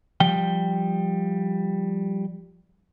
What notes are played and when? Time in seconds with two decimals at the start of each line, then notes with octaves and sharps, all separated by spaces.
0.20 F3 G3 G5